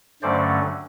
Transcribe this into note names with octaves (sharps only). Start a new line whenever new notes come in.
G2 D3 F#3 A3 C#4 C5 D5